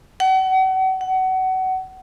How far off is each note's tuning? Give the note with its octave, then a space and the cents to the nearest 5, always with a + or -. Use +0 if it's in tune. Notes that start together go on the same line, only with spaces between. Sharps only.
F#5 +35
F#5 +25